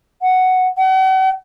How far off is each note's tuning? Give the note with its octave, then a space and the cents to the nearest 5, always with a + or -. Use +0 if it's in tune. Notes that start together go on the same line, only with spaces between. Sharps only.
F#5 +0
F#5 +40